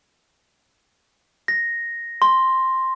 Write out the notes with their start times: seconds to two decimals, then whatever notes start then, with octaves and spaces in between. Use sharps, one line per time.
1.48 A#6
2.22 C6